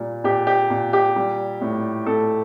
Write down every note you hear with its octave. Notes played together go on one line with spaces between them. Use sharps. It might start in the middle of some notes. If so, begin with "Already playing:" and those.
Already playing: A#2 G3
A#2 G4
G4
A#2
G4
G3
A2
A2 A4